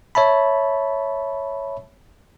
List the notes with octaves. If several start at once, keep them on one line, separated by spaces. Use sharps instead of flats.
C#5 E5 A5 B5